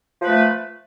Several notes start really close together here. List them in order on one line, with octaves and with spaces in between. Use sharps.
F3 B4 A3